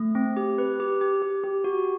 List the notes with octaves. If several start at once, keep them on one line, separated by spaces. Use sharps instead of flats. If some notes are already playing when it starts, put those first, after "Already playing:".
Already playing: A3
C4
G4
B4
G4
G4
G4
G4
F#4